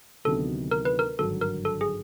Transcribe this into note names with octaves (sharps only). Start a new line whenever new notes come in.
D2 C3 D#3 F#3 B3 A4
A#4
B4
A#4
G#1 G2 D3 F#3 A4
A#4
A4
G#4